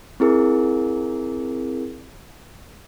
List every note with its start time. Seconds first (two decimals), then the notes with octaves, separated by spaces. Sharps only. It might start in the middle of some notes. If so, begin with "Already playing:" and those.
0.20 C4 E4 G#4 A#4